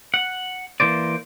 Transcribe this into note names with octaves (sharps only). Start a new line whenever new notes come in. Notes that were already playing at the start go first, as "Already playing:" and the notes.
F#5
E3 A#3 C5 D5